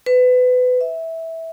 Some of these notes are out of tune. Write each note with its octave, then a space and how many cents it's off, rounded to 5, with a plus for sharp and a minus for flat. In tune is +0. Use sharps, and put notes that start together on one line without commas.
B4 +25
E5 -15